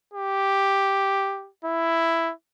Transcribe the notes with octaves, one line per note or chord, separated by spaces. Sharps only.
G4
E4